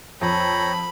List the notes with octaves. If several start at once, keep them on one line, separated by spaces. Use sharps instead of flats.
F2 C#5 G5 A#5 B5